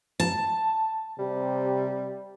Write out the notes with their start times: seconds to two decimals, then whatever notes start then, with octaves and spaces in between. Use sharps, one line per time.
0.20 A5
1.19 C3 G3